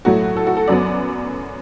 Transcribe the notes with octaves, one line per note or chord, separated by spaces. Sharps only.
A2 F#3 A3 F#4
A4
F#4
A4
F#2 F#3 B3 D5